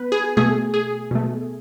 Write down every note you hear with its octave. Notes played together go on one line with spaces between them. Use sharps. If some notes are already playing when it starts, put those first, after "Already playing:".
Already playing: B3 B4
G#4
B2 A3 G#4
G#4
B2 A3